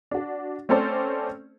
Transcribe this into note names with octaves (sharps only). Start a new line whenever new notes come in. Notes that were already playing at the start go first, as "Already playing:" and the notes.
D4 F#4
A3 C4 C#4 A4 C5 D5